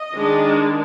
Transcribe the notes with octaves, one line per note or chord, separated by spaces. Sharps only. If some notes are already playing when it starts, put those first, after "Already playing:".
Already playing: D#5
D#3 G#3 D4